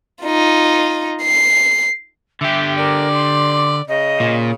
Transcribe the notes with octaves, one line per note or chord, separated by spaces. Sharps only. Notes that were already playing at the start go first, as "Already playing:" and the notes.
D#4 F4
C7
D3 G4 E5
A#4 D5
C6
C#3 D#5
A#2